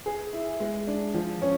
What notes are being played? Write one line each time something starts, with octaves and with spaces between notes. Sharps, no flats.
G#4
E4
G#3
D4
F3
C#4